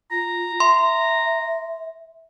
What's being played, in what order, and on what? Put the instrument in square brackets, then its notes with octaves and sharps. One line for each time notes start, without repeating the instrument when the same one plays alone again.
[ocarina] F4 [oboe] A#5
[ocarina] E5 [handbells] C6